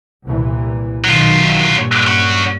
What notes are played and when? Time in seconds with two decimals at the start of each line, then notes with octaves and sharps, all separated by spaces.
0.25 C2 A#2 E3
1.04 B1 D#3 F#3 F4
1.74 G2 A#2
2.07 C#4 F#5